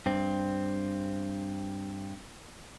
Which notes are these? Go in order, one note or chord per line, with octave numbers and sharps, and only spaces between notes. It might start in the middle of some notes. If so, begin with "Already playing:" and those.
G2 C4